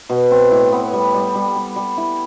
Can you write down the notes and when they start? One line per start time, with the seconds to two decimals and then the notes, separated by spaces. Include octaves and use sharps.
0.09 B2
0.31 C4
0.51 A2
0.72 B3
0.93 G3
1.14 G3
1.35 G3
1.56 G3
1.76 G3
1.98 E4